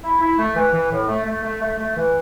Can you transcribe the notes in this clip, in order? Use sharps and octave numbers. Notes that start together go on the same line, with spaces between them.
E4
E4
A3
E3
E3
A2
A3
A3
A3
A3
A3
E3